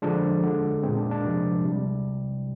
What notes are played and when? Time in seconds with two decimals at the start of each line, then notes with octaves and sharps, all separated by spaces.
0.02 D3 F3 G#3 D4
0.43 D3 G#3
0.83 A#2 G#3 C4
0.97 D4
1.11 D4
1.25 C3 F3 G#3
1.64 C3 G3